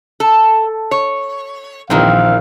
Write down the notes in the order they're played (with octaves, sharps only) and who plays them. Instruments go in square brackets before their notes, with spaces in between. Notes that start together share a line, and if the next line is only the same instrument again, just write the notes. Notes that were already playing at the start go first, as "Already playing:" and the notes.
[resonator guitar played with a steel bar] A4
C#5
[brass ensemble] A#1 F5 [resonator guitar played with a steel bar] D#3 E3 C4